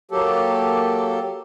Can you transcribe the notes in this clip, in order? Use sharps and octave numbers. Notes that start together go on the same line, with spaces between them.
F#3 A#3 G4 A4